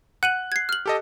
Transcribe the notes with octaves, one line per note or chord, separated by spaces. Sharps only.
F#5 F#6 D#7 F#7
G#6 C7
F6 F#7
G4 A4 D#5